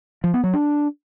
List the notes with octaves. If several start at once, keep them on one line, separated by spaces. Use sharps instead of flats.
F3
B3
F#3
D4